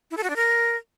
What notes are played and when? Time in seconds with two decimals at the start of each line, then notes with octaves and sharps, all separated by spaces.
0.11 E4
0.17 A4
0.23 F#4
0.30 D4
0.36 A#4